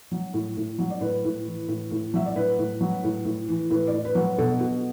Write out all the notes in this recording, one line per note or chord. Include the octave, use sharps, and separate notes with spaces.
F#3
A2
A2
F#3
D5
A2 B4
A2
E3
A2
A2
F#3 E5
D5
A2 B4
A2
F#3
A2
A2
E3
A2 B4
D5
A2
B4
F#3
B4
B2 A4
B2 F#4